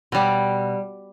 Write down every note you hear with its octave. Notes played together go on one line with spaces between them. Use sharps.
B2 G3